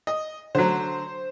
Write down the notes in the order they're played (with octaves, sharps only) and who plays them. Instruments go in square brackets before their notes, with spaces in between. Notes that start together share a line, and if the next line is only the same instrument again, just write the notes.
[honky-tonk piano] D#5
[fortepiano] D3 F#3 [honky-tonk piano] C5